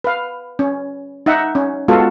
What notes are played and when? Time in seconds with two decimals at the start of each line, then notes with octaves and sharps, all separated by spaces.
0.04 B4 F5
0.59 C#4
1.26 D#4 E5 F#5
1.55 C#4
1.88 G#3 B3 F4 F#4 A4